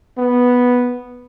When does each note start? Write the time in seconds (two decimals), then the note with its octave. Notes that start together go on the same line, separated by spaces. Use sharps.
0.18 B3